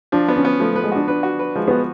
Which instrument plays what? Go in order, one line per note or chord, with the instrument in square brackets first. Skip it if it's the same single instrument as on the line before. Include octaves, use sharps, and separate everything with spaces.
[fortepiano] F3 [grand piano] D4
[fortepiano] B3
[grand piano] C#4
[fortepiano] B3
[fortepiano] F3 [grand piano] A3
[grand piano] A3 [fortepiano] B4
[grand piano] G#3
[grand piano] D4 [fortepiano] F#4
[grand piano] D4 [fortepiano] B4
[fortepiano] F#4
B4
[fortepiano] F3 [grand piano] G#3
[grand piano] B3 [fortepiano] F#4